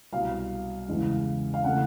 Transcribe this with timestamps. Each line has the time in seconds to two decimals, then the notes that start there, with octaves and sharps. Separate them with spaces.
0.12 C2 B2 F#3 F5
0.88 E2 C#3 E3 G#3
1.54 F5
1.64 C#3 E3 A3 F#5